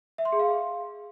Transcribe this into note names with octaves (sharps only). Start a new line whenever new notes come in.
E5
C6
G#4
F5